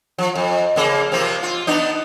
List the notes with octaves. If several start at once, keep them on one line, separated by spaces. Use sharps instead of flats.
F3
F2
C#3 A#3
C3 F3 A#3
F4
B3 D4 D#4